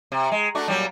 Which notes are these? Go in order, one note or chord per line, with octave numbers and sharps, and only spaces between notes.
C3
G#3
A3 D4 F#4
A#2 F#3 G3